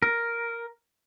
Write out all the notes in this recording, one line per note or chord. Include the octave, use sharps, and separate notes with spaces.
A#4